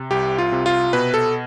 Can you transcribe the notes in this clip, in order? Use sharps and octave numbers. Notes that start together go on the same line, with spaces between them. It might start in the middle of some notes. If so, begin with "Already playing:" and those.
Already playing: C3
C2 G4
F4
C3
F4
B2 B4
A4